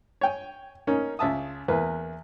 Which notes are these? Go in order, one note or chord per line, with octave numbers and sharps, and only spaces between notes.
C#5 G5 G#5
A#3 C#4 D#4
C#2 E5 A5 D#6
E2 A#3 E4 B4